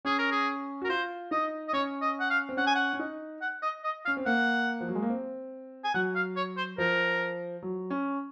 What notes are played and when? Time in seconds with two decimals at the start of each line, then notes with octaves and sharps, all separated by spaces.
0.05 C#4 G#4
0.18 A#4
0.31 G#4
0.82 F#4
0.84 A#4
0.89 F4 C5
1.31 D#4 D#5
1.68 D#5
1.73 C#4 C#5
2.02 D#5
2.20 F#5
2.30 F5
2.49 C4
2.57 C#4 F#5
2.66 G#5
2.75 F#5
2.93 C#4
2.99 D#4
3.41 F#5
3.62 D#5
3.84 D#5
4.05 C#4 F5
4.17 C4
4.26 A#3 F#5
4.80 F3
4.88 F#3
4.95 G#3
5.02 A#3
5.10 C4
5.84 G#5
5.94 F#3 F#5
6.15 F5
6.36 C#5
6.57 C5
6.78 F3 A#4
7.63 F#3
7.90 C#4